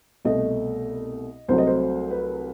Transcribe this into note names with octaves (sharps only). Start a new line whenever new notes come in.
C2 B2 A3 D#5
C2 C3 F#3 A3 C5
D#5
C5
B4